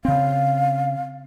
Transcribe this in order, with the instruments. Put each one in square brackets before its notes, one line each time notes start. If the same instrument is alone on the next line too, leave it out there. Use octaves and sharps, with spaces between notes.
[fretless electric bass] C#3 C4 [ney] F5